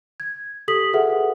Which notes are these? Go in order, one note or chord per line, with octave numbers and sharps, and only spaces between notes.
G#6
G4 A4 D#6 B6 F#7
F#4 G#4 A4 B4 E5 F#5